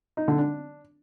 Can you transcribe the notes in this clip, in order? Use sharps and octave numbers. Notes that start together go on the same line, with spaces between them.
D#4
D3
D4